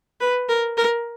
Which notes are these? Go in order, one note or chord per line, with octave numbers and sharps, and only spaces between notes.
B4
A#4
A#4